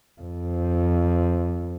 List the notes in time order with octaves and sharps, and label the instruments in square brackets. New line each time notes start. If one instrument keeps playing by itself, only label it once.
[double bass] F2